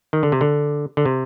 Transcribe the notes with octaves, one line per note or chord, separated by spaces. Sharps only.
D#3
D3
C3
D3
D3
C3